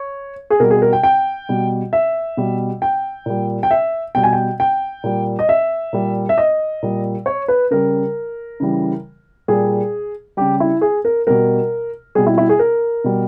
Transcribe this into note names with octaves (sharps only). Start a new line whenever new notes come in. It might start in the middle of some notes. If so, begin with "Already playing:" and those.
Already playing: C#5
G#4
B2 G3 A#4
G#4
A#4
G5
G5
B2 G3
E5
B2 G3
G5
A#2 G3
G5
E5
B2 G3 G5
G#5
G5
G5
A#2 G3
D#5
E5
A#2 G3
E5
D#5
A#2 G3
C#5
B4
C#3 G3 A#4
C#3 E3 G3
A#2 G3 G#4
C#3 G3 G4
E4
G#4
A#4
B2 G3 A#4
B2 G3 G#4
E4
E4
G#4
A#4
B2 G3